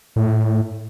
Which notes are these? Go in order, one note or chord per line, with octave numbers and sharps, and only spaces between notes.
A2